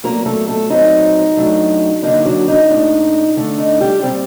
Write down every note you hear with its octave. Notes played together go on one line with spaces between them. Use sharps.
A#2 F#3 A3 A#3 A#4
A3 A4
A3 A4
A#2 F#3 C4 D#4
A2 F#3 A3 D4
D3 F#3 A#3 D4 D#4
F#3 F#4
D#4
A#2 A3 D4
D3 A3 D4
D#4
G3 G4
A#2 G3 C4